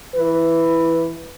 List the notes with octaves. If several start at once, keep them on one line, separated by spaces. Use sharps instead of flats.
E3 E4 B4